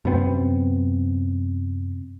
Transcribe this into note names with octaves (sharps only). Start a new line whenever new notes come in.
F#2 C3 B3 C4